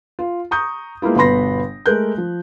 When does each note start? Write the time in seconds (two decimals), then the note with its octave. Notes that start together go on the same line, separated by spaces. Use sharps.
0.19 F4
0.51 A#5 C#6 D#6 G6
1.02 G#3 A#3 B3 E4 F4
1.16 G1 B2 B3 B5 C6 A#6
1.86 G#3 A3 A#4 F#6 G6
2.18 F3